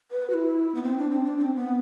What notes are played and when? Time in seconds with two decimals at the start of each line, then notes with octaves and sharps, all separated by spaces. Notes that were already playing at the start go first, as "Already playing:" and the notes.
0.11 B4
0.30 F#4
0.34 E4
0.75 B3
0.83 C4
0.97 D4
1.10 C4
1.24 D4
1.38 C4
1.55 B3